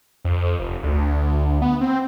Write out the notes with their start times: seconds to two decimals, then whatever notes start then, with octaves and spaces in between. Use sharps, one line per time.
0.25 F2
0.59 F1
0.83 D2
1.62 B3
1.81 C4